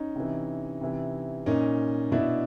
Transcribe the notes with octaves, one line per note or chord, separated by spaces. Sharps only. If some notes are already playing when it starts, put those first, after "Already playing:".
Already playing: C#4 D#4
C3 E3
C3 E3
A#2 C#4 D#4
B2 D4 E4